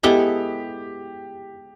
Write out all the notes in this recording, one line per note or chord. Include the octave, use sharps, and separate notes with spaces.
G#3 B3 E4 G4 A4